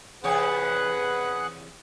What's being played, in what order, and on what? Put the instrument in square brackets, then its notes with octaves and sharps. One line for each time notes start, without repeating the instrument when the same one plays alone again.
[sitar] E2 C3 C#5 [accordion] G#4 F#5 F#6 [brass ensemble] B4